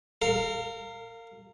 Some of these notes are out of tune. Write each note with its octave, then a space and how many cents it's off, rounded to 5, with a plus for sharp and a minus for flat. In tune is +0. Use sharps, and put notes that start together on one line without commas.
A#4 -30 F5 +0